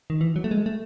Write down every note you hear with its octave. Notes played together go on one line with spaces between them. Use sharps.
D#3
E3
F#3
A3
G#3
A3